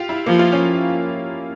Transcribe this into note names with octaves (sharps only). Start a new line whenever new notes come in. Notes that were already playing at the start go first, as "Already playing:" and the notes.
Already playing: F4 G4
E4
F3 A#3
F4
C#4